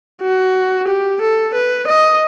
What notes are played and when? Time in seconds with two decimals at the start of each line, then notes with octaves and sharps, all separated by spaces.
0.22 F#4
0.88 G4
1.21 A4
1.55 B4
1.88 D#5